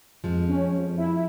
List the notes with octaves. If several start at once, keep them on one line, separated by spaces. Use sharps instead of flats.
F2 F3 G#3
C#4
F2
E4